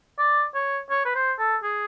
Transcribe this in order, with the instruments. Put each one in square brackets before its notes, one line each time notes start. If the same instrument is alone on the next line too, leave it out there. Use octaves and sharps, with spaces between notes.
[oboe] D5
C#5
C#5
B4
C5
A4
G#4